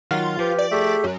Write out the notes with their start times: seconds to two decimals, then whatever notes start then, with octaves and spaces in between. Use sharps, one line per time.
0.11 D#3 F#3 F4 F#4
0.39 F3 G4 B4
0.58 D5
0.71 A3 G4 G#4 E5
1.04 F#2